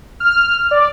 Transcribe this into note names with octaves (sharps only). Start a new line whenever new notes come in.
F6
D5